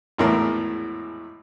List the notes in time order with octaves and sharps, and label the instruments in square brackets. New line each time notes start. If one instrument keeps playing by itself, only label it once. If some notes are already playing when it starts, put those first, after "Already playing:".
[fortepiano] G#1 E2 A2 E3 A#4